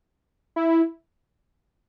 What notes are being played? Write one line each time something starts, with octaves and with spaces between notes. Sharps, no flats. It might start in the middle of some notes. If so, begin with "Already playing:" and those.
E4